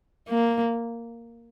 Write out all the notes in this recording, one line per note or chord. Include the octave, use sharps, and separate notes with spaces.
A#3